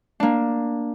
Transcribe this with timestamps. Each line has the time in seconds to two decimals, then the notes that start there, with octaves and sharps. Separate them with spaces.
0.20 A#3 D4